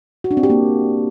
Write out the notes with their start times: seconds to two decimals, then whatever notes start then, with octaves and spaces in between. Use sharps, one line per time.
0.24 F#4
0.31 D4
0.37 C4
0.43 G4
0.50 A#3